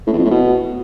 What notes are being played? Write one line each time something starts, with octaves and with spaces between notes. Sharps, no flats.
A2
E2
F2
A2
B2